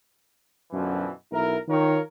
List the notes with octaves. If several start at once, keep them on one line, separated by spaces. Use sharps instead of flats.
F#2 B2 D3 E3 F3
B1 E4 A#4
D#3 F4 A#4 C#5